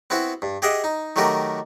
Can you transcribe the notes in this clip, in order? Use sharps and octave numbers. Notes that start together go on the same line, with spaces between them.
B3 C4 E4 F#4
G2
G4 G#4 D#5 E5 F#5 G5
D#4
D#3 F#3 A3 F#4 G4 A#4